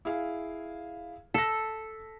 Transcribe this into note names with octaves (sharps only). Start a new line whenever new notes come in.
E4 G#4 F5
A4 A#6 B6